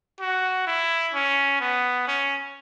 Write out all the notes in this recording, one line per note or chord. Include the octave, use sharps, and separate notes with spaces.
F#4
E4
C#4
B3
C#4